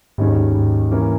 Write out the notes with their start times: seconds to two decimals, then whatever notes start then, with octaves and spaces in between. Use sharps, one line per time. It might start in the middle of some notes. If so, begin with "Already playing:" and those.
0.18 D#2 G#2 D#3 G#3 C#4
0.55 G#2
0.91 E3 A#3 C#4